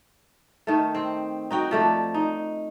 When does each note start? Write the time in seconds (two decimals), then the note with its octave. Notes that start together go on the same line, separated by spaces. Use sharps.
0.67 D#3 A3
0.95 C4
1.51 D#4 F#4 G5
1.71 F3 A3 D5
2.14 D#4